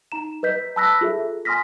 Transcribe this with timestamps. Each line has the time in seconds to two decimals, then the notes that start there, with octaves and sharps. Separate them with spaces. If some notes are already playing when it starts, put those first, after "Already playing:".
0.12 D#4 A#5 E7
0.43 B4 D#5 G6 B6
0.76 A5 B5 E6 F#6 A#6 B6
1.01 F4 G#4 A4 E5
1.45 G#5 C6 D#6 F6 A#6 B6